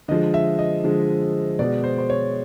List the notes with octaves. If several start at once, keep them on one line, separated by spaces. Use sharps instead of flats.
D3 F3 G#3 D#5
E5
D#5
D3 F3 G#3
B2 G#3 D5
C5
C5
C#5